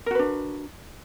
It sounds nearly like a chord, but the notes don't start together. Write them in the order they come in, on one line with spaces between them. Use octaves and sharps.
A#4 F#4 B4 D4